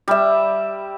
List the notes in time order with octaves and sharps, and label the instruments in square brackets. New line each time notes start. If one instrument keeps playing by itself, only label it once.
[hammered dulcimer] G3 E5